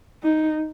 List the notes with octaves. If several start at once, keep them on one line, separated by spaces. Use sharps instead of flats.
D#4